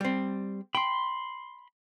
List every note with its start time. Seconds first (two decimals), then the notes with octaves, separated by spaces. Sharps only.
0.01 G3 C4
0.75 G5 B5 C6